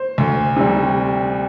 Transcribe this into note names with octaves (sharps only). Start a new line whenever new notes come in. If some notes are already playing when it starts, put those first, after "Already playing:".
Already playing: C5
D2
C3 G3